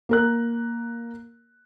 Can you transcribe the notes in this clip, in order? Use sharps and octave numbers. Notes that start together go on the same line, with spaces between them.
A#3 A#4 F#6